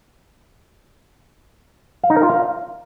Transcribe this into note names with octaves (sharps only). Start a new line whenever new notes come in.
F5
D#4
A#4
F4
F5